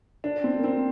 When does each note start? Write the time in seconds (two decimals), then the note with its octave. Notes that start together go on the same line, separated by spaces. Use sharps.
0.24 D4
0.44 C4
0.59 A#3
0.64 C4